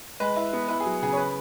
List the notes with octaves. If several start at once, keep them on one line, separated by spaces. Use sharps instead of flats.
G#3 B4
E4
B3
E4 B4
G#4
F#3
C#3 G#4
C#5
B4